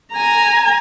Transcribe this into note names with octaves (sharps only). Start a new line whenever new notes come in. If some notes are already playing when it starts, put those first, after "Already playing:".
G#5 A#5